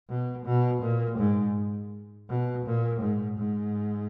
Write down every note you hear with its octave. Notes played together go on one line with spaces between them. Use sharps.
B2
B2
A#2
G#2
B2
A#2
G#2
G#2